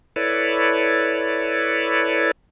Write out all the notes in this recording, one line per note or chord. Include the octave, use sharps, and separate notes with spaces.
E4 A4 B4 C#5 D5